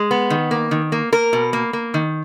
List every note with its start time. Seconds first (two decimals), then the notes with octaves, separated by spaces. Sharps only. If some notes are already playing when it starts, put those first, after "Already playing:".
Already playing: G#3
0.11 B3
0.30 D#3
0.51 A#3
0.71 D#3
0.92 A#3
1.12 A#3 A#4
1.33 B2
1.53 A#3
1.73 A#3
1.94 D#3